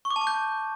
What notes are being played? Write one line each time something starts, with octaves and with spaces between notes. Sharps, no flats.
C#6
D6
A5
D6
G6